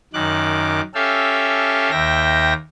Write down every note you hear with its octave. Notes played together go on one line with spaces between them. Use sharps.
F#2 D#3 D6 F#6
C#4 G4 A4 E5 F5
D#2 E5 G5 A#6